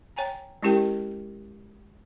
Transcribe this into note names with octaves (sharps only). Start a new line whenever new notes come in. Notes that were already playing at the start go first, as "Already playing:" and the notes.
C#5 G5 G#5 A#5
G#3 C#4 E4 G4 A#4 G5